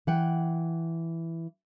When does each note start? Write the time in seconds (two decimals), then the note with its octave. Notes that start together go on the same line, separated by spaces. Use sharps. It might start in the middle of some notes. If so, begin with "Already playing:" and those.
0.07 E3 F#5 G5